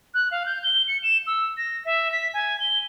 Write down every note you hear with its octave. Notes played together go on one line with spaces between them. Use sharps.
F#6
F5
G6
G7
C#7
E7
E6
A#6
E5
B6
G#5
G7